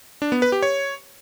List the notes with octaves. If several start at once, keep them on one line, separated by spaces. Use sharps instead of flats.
D4
B3
B4
G4
C#5